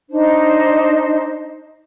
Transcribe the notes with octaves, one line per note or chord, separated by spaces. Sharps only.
D4 D#4 C5 D#5